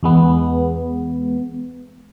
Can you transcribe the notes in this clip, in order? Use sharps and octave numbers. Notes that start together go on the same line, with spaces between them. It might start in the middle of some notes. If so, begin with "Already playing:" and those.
E2 G#3 B3